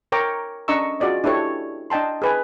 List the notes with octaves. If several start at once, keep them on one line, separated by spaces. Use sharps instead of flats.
A#4 C#5 G5 A#5 C#6 D6
C#4 D4 D#5 A#5 C#6 E6
F4 F#4 G#4 D5 D#5
D4 E4 G4 A4 C#5
D4 D#5 G5 A5 C6
G#4 B4 G#5